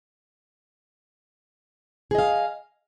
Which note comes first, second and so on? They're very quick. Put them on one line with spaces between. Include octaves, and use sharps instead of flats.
G#4 D#5 F5